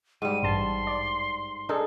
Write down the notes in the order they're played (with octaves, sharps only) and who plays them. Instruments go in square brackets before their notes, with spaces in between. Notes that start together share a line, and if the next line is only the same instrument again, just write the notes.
[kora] G#2 G3 [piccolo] D#7
[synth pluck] A1 G2 A5 [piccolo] C6
[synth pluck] D5
[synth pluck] D4 G#4 A4 [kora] D#4